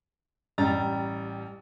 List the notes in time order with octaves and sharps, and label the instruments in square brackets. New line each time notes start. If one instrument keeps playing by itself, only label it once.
[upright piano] A1 G3 A#5 A6